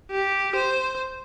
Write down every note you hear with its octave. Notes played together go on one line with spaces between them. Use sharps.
G4
C5